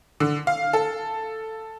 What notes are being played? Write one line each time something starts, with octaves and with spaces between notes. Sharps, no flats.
D3
F5
A4